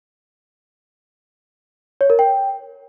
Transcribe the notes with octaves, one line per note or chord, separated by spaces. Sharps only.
C#5
A#4
G5